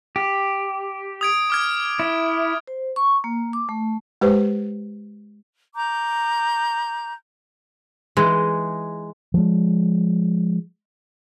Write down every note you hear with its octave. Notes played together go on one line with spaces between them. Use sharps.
G4
D#6 G#6 D7
D6 F6 G#6
E4
C5
C#6
A#3
D6
A3
G#3 G4 B4 C5
A#5 D6 G6
E3 G#3 D#4 G#4
F3 G#3